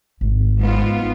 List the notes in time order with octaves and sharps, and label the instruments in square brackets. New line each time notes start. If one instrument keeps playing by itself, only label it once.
[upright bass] G#1
[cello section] G#2 B3 F4